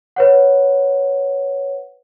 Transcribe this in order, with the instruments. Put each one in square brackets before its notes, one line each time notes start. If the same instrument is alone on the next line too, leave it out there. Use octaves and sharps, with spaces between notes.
[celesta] B4 C#5 F#5